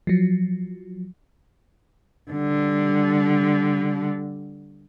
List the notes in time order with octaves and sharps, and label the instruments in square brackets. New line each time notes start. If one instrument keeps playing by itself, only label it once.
[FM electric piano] F3 F#3
[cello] D3 G3